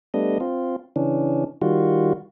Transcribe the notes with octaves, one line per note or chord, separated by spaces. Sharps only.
G3 A3 B3 D4 D#5
C4 F4
C#3 E3 C#4 D4
D#3 G3 F4 F#4